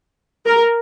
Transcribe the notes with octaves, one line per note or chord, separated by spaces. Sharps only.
A#4